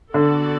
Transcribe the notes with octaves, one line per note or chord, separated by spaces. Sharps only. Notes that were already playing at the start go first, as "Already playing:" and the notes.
D3 B3 F#4 A4 D5